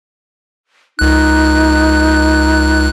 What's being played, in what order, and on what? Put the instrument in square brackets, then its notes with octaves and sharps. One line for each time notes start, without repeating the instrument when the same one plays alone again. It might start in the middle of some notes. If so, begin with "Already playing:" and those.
[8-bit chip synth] C#2 F#6 [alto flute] D#4